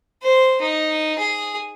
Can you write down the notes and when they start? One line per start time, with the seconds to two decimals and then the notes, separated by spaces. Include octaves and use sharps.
0.23 C5
0.61 D#4
1.19 G#4